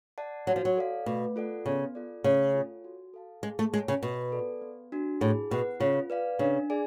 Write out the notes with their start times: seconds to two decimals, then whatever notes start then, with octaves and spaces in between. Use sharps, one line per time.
0.18 D5 F#5 A5
0.47 F#3 F#4
0.56 F3
0.65 F#3
0.77 A4 D5 F5
1.06 B2 A3
1.36 F4 A4 D5 F#5
1.66 C#3 B3
1.95 F4 A4 D5
2.24 C#3 A3
2.54 F4 A4 C#5
2.84 F#4
3.14 A4 F5 A5
3.43 G#3 G#4
3.59 A3
3.73 G#3 C#5 F#5
3.88 C#3
4.03 B2 F#4
4.32 A4 D5
4.61 B3
4.92 D4 F#4
5.21 A2 G#4
5.51 B2 B4 F#5
5.80 C#3 F4
6.10 B4 D5 F5
6.39 C#3 D4
6.70 G#4 D5 G#5